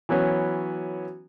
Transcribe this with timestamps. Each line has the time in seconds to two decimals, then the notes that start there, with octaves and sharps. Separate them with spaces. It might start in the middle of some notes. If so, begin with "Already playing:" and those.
0.09 E3 F#3 B3 C#4